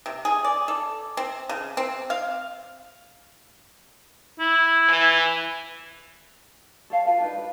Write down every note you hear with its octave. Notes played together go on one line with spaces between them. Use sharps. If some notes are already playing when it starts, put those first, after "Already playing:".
C3
G#4
D5
A4
C4
C#3
C4
F5
E4
E3
A4 C#5 F5 A5
F4 A4 B4 F5
D4 D#4 B4
B4